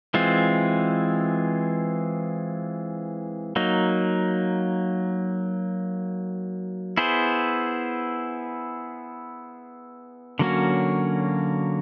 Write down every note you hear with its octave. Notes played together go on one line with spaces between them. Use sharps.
E3 G#3 C4 F4
F#3 A#3 D#4
B3 E4 G#4 C5
D3 F#3 A#3 C#4 F#4